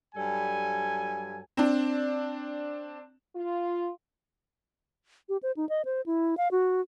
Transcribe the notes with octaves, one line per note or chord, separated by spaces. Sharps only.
G2 F#3 G3 A4 G#5
C4 D4
F4
G4
C5
D#4
D#5
C5
E4
F5
F#4